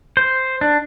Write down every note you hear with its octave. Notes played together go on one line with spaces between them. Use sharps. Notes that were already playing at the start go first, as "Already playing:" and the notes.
C5
D4